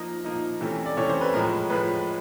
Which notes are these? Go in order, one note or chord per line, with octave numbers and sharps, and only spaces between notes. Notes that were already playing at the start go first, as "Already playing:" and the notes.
Already playing: F3 A#3 D#4 D#5
F3 A#3 D#4
C3 E3 A3 C#4
D5
C3 E3 A3 C#4 C#5
C5
B4
A2 F3 G#3 A#4
A2 F3 G#3 B4